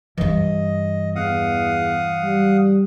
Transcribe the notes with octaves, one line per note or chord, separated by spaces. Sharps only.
G2 E3 D#5
E2 F5 F#5 D#6
G3